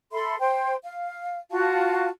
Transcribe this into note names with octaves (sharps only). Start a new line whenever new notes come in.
A4 E5 B5 C6
C5 G5
F5
F4 F#4 F5 A5